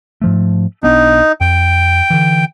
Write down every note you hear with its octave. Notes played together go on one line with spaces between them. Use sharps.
G#2 F3 A3
B1 B3 D4 D#4
F2 G5
D3 E3